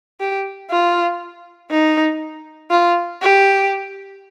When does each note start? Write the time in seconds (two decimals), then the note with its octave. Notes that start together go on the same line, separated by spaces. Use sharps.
0.20 G4
0.71 F4
1.70 D#4
2.71 F4
3.22 G4